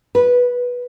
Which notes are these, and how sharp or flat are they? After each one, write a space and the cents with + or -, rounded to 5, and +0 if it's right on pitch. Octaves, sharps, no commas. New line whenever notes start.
B4 -10